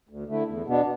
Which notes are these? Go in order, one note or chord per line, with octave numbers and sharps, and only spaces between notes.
D2
D3 A3 E4
E2
B2 B3 D4